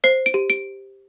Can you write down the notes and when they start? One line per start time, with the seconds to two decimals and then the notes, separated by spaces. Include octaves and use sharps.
0.04 C5 C7
0.26 D7
0.34 G4
0.50 D7